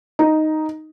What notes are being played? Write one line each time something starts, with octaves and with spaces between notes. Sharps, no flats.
D#4